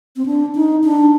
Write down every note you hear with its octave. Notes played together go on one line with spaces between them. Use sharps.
C4
D4
D#4
D4